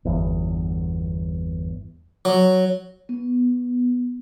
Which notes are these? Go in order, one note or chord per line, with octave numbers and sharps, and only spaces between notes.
G1 E2
F#3
B3